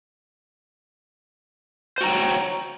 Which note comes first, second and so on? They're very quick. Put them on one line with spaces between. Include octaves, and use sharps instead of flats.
C5 F#4 A#5 G5 C#5